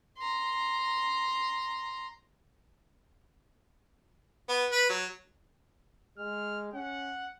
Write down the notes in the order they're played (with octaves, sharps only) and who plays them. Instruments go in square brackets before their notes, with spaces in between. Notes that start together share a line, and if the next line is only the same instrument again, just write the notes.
[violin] A#5 C6
[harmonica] B3
B4
F#3
[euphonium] G#3 [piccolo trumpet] F6
[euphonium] C#4 [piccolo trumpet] F#5